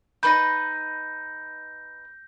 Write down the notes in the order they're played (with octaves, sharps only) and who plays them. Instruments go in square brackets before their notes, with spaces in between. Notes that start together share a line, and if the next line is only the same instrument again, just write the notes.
[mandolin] D#4 B4 B5 [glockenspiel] G6 A#6